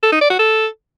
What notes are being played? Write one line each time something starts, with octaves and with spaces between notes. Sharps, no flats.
A4
D#4
D5
F#4
A4